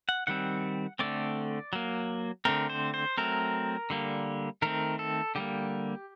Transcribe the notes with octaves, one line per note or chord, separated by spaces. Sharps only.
F#5
D#3 G3 C4 F#5
D3 A3 C4 D5
F#3 A#3
D3 A3 C4 A#4
C5
C5
F#3 A3 C4 A#4
D3 G3 A#3
D#3 A3 C4 A#4
A4
D3 G3 A#3 G4